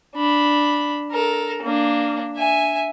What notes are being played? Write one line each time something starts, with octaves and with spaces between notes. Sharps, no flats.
D4 B5
A4 A#4
A#3 D4
E5 G#5